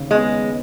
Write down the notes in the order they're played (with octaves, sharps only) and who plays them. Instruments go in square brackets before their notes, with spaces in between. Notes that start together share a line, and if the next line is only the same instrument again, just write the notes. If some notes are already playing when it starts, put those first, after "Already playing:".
Already playing: [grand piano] D#2 C#3
[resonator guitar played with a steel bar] G#3 [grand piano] B3